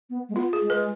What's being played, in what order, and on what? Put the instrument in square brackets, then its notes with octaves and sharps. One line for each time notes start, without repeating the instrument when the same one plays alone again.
[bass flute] B3
G#3
[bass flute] B3 [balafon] F4
[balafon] G#4
[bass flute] G#3
[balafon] B4